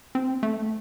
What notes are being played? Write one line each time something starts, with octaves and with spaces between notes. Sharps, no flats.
C4
A3